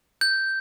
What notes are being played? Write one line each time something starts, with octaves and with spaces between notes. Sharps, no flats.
G6